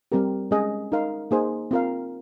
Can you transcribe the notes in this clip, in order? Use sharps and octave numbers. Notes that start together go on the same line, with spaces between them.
G3 C4 G4 A#4
G#3 C#4 G#4 D#5
D#4 A#4 F5
A#3 D#4 G#4 C5
C4 F4 A#4 F5